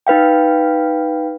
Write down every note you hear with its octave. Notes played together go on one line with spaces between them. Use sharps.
D#4 B4 F5 G5